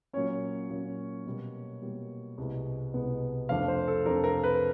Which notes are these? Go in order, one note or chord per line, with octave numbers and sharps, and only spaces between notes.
A#2 F#3 A#3 C#4 C#5
A#2 F#3 A#3 C#4
B2 G3 A#3
B2 G3 A#3
C2 B2 G#3 B3
C2 B2 G#3 B3
F2 C3 F3 A3 D4 F5
C5
A4
F2 C3 F3 A3 D4 A#4
A#4
B4